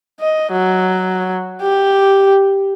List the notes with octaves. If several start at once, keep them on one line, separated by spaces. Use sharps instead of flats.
D#5
F#3
G4